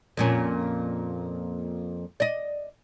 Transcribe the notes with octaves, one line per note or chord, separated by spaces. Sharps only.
F2 A#2 C#4
D5 D#5